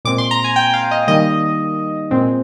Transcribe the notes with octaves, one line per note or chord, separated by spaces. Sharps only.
A#2 G#3 C4 D6
C6
A#5
G#5
G5
F5
D#5
D#3 G3 A#3 D#5
A#2 G#3 C4